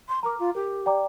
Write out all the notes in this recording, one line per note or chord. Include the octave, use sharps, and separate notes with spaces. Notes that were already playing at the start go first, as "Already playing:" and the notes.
C6
A#4 A#5 D6
F4
G4 A#4
D5 G5 A#5 D6